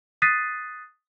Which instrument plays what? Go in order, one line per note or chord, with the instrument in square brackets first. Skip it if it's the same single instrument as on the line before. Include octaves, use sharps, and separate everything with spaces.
[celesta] D#6 F#6 A6 B6 C7 D#7